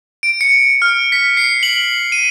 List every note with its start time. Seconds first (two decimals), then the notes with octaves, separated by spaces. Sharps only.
0.23 D7
0.41 C#7
0.82 F6
1.12 B6
1.37 C7
1.63 F#7
2.12 D#7